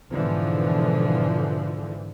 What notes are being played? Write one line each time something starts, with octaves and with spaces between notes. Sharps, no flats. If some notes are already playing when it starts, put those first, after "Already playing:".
G#2 B2 D3 E3 F3